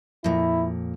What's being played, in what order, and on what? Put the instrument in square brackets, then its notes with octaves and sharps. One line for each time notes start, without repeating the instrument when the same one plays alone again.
[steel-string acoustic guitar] F2 A#2 [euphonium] E4